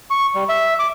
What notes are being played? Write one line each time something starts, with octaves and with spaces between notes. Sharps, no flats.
C#6
G3
E5
D6